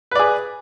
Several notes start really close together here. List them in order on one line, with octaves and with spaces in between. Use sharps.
B4 D5 G#4